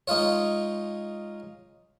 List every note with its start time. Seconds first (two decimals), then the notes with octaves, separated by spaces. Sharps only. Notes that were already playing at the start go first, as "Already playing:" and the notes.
0.08 G#3 D#4 F4 C#5